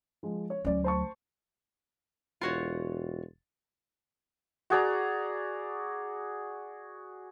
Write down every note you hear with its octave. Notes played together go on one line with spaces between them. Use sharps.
F3 G#3
C#5
D2 F#3 C#4 D5
C5 A5 C#6
E1 F4 F#4 C#5
F#4 G#4 D5 A#5